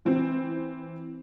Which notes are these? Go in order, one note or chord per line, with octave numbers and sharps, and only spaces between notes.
E3 C4